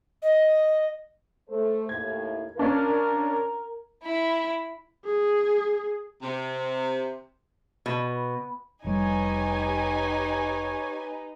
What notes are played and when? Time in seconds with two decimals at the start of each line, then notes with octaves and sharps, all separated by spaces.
0.22 D#5
1.49 A3 A4 C5
1.89 D#2 A2 G#6
2.57 C#4 D4 F4 A#4
4.04 E4 B5
5.05 G#4
6.22 C3
7.86 B2
8.84 F1 G3 D#4 G4 B4 C#5 G#5